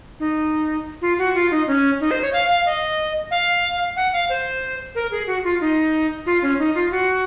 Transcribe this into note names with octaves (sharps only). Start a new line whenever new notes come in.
D#4
F4
F#4
F4
D#4
C#4
D#4
C5
C#5
F5
F5
D#5
F5
F#5
F5
C5
A#4
G#4
F#4
F4
D#4
F4
C#4
D#4
F4
F#4